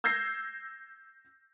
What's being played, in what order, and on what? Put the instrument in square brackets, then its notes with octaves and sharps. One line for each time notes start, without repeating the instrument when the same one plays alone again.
[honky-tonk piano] E6 G6 G#6 A#6 C7